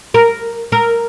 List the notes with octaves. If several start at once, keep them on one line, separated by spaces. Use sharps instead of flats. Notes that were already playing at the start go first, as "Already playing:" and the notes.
A#4
A#4